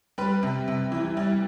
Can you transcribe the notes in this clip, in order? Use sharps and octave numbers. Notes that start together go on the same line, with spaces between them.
G3 B4
C3
C3
E3
G3